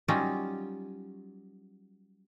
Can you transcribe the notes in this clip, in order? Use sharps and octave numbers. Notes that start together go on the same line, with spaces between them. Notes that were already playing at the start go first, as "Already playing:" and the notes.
F#3 G3 C#4 D#4 F4